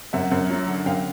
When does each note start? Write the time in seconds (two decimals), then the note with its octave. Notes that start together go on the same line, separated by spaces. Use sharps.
0.13 F#2 E5 F#5
0.31 F#2
0.50 F#3
0.68 D3
0.86 F#2 F5 G5